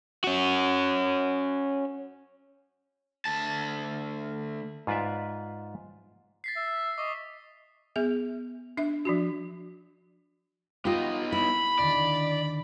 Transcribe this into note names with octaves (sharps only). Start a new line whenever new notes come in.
C#4 F#4
D2 A5
G#2 F4 B4 D5 E5
A6 B6 C7
E5
B6
D#5 C#6 D6
B3 G#4 E5
D4 E5
F3 D4 F#4
B3 D#4 F4 G4 D#5
E4 B5
D#2 D3 D#3 D5